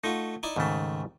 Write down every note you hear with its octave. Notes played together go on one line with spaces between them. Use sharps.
A3 D#4 F4 F#4
D#4 E4 D5
D#2 G#2 C#3 A3 C4